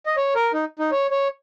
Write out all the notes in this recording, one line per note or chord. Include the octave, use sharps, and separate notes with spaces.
D#5
C#5
A#4
D#4
D#4
C#5
C#5